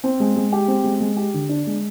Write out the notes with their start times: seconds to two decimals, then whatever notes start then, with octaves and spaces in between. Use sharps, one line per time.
0.04 C4
0.20 G#3
0.36 G#3
0.52 G4
0.68 C4
0.84 G#3
1.00 G#3
1.17 G4
1.34 D3
1.49 D4
1.67 G#3